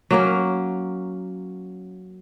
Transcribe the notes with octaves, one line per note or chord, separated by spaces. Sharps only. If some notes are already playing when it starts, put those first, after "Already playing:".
F#3 A#3 C#4